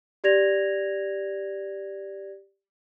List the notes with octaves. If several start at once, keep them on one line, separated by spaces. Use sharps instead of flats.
G4 D5 G#6 A#6 F7